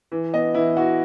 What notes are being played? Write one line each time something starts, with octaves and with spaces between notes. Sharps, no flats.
E3
B3 D#5
E3 E4
E3 F#4